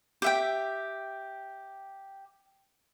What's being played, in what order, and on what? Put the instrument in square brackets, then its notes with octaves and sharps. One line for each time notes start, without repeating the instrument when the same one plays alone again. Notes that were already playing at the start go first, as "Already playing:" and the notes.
[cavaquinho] G4 E5 G5